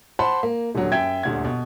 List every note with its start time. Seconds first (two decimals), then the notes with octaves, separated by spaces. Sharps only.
0.19 C5 F#5 A5 B5 C6
0.43 A#3
0.75 D#1 D3 F#3
0.92 F#2 E5 G5 G#6
1.23 D#1 D2 G#6
1.45 B2